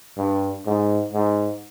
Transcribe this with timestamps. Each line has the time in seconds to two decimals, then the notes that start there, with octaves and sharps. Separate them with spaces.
0.17 G2
0.66 G#2
1.13 G#2